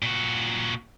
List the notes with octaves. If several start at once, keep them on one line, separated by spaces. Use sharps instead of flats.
A#2 F#4